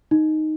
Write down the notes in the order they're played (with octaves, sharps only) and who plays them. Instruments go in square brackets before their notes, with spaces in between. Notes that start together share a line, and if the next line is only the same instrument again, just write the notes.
[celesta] D#4